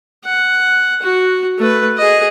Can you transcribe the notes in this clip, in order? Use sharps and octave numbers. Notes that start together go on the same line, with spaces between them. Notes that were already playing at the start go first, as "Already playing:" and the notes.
F#5
F#4
A3 B4
G#4 D#5